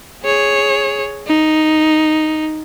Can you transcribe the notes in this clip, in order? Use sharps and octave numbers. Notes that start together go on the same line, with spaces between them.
G#4 C#5
D#4